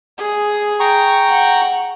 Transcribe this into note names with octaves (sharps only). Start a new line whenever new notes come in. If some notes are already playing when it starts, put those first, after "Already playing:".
G#4
G5 A#5 C#6
F#5